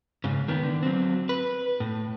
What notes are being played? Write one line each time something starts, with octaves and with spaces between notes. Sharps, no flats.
G#2 C#3
D#3 B3
D3
F#3 C4
B4
A2